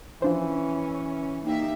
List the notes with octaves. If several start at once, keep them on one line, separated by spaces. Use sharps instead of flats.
E3 F3 C#4 D4 C5
A#3 D#4 G4 E5